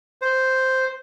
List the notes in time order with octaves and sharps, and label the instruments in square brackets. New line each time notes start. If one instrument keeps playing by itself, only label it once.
[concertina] C5